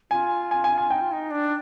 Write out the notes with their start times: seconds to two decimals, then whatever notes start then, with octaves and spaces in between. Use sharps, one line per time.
0.11 F4 G#5
0.51 G#5
0.64 G#5
0.78 G#5
0.90 D#4 G5
1.01 F4
1.12 D#4
1.31 D4